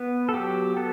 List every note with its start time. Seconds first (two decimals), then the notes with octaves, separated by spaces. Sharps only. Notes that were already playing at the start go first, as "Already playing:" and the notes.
Already playing: B3 B4
0.29 A4
0.34 F#3 G4
0.77 B3 A4